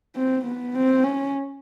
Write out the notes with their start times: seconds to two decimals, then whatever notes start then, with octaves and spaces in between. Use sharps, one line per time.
0.16 C4
0.45 B3
0.74 C4
1.03 C#4